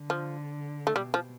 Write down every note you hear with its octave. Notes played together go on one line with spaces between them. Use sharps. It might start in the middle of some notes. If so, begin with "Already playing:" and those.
Already playing: D3
F3
A3
B2 G3
F3